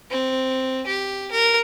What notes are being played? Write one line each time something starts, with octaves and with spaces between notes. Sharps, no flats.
C4
G4
A#4